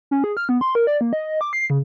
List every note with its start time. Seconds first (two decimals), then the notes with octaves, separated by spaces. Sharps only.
0.11 C#4
0.24 G#4
0.37 F6
0.49 B3
0.61 C6
0.75 A#4
0.87 D5
1.01 A#3
1.13 D#5
1.41 D6
1.53 C7
1.70 C#3